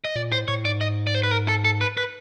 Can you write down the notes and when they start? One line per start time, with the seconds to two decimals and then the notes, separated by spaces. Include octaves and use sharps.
0.05 D#5
0.15 A#2 D5
0.31 A2 C5
0.48 A2 C#5
0.65 G#2 D5
0.81 D#5
1.07 D5
1.15 C5
1.23 B4
1.31 A#4
1.48 A4
1.65 A4
1.81 B4
1.97 B4